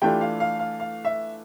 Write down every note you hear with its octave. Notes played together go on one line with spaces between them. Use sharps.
E3 A3 D4 F4 G4 G5
F5
F5
F5
F5
E5